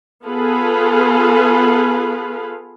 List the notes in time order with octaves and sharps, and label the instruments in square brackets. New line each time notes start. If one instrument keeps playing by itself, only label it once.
[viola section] B3 F4 G#4 A4 B4 F5